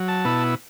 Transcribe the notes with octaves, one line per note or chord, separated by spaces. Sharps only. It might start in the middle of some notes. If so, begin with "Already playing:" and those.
Already playing: F#3
A5
B2 B3 E4